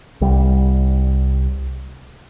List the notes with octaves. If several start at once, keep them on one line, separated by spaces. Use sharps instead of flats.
C2 G3